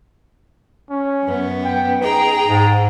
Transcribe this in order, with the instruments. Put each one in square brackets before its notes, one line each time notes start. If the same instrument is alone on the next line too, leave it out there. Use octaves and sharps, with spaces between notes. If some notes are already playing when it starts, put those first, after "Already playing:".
[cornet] C#4
[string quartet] F#2 B3
[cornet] G5
[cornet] D#4 [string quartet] G#4 G5 A#5
[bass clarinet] G#2 [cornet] D#4